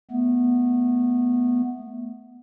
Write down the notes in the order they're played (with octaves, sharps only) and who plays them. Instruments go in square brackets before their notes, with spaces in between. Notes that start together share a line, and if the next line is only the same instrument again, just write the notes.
[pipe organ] A3 B3